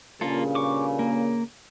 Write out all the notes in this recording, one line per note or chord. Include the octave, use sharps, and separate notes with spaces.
G2 A#2 C#3 A#3 F4 A4
C#6 D6
A#3